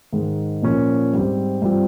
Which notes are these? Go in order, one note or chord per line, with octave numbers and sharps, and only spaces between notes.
G#2 D#3 G#3
A#2 F3 A#3 C#4
G#2 G3 C4
G2 G3 C4 F4